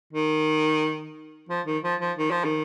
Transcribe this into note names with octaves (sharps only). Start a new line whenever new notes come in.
D#3
F3
D#3
F3
F3
D#3
F3
D#3